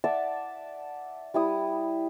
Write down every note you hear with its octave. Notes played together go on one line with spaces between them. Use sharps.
D5 E5 F#5 A5
G3 E4 D#6